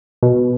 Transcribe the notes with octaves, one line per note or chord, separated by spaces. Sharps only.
B2